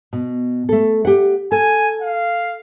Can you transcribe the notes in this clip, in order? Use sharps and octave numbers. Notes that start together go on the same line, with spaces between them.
B2
A3 A4
G4 F#5
A4 G#5
F5